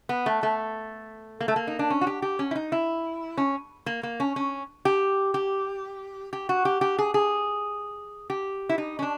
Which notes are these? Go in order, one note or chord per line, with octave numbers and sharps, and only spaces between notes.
B3
A3
A3
A#3
A3
A#3
D#4
D4
C#4
F#4
G4
G4
C#4
E4
D#4
E4
C#4
A#3
A#3
C#4
C#4
G4
G4
G4
F#4
G4
G4
G#4
G#4
G4
E4
D#4
C#4
D4